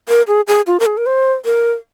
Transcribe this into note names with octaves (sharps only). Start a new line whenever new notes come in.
A#4
G#4
G#4
F4
A#4
G#4
A#4
C5
A#4